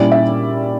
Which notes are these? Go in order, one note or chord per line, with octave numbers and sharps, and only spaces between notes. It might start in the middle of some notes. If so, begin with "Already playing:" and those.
Already playing: A#2 G3 C#4 E4 D5
E5